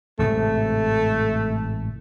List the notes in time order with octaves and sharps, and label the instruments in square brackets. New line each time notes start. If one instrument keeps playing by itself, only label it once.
[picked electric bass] A1 G#2 C3 [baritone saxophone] A3